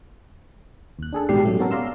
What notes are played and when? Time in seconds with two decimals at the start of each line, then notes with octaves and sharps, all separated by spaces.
0.99 D#2 F#6
1.13 D4 G#4 A4
1.29 A1 G#2 B2 G3 G4 C7
1.45 F#2 F#3 A3
1.59 B2 C#4 F#4 A4 A#4
1.71 D5 F5 A#5 C6 E6